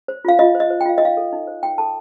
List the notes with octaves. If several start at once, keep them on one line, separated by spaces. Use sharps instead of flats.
C5
F4 F5
F4 D#5
C5
D#5
C5
G5
F4 F5
D#5
D#4 F5
A4
D#4
C5
D#4 G5
A4 A5